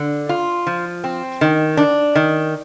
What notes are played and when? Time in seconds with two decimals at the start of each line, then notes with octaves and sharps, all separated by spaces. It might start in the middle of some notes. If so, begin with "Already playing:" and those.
Already playing: D3
0.29 F4
0.67 F3
1.04 C4
1.41 D#3
1.77 D4
2.15 D#3